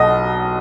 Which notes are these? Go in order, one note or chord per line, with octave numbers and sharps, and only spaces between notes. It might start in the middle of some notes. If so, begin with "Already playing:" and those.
Already playing: B1 B2 D#5